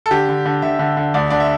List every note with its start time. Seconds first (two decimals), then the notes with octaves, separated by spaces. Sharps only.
0.06 A4
0.11 D3 G4
0.29 D3
0.46 D3
0.62 D3 E5
0.79 D3
0.97 D3
1.14 D2 D5
1.30 D3 D5
1.40 E5